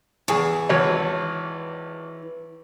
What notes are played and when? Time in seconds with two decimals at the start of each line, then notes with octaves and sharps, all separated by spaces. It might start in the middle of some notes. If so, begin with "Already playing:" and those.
0.28 E2 E3 G#4 C#6
0.69 G#1 E2 C#5